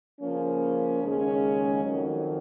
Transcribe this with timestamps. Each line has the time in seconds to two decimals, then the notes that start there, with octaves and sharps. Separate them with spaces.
0.21 C#3 F3 A#3 C#4
1.02 D#2 C#3 G#3 C#4
1.84 F2 D#3 F#3